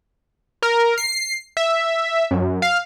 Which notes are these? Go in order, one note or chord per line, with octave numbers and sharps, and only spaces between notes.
A#4
C7
E5
F#2
F5